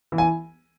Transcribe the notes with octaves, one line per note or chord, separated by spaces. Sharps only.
E3
G#5